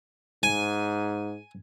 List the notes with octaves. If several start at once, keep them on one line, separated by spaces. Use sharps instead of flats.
G#2 G#5